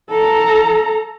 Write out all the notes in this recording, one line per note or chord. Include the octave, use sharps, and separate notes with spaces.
A4 A#5